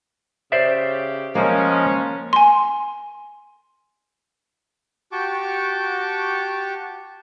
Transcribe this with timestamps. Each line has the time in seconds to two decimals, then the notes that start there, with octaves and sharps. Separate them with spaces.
0.52 C#3 G4 C5 D5 E5
1.35 F3 G#3 A#3 C#4
2.33 G#5 C6
5.12 F#4 G4 G5 A5 C#6 D6